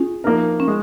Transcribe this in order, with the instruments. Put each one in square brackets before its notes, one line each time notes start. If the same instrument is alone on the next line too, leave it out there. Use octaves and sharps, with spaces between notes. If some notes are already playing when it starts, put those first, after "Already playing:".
Already playing: [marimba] C#4 F4 [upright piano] G#4
[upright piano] F3 A#3 D#4 A#4
[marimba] C#4
[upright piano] G#3